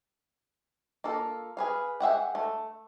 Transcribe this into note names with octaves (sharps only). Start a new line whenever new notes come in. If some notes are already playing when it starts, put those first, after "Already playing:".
A#3 F4 A4
G#4 B4 F5
G#4 E5 F#5 G5
A3